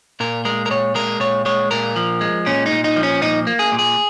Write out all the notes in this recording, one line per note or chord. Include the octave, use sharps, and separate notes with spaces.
A#2 A#4
G#3 A#4
A#4
A#2 C#5
G#3 A#4
A#2 C#5
G#3 C#5
A#2 A#4
F3
G#3
A#2 C#4
D#4
A#2
D#4
F3
C#4
A#2 D#4
A#3
G#4
A#2
G#4